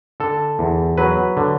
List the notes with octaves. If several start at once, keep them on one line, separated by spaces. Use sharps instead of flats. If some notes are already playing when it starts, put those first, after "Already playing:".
D3 A4
E2
F#3 B4
D3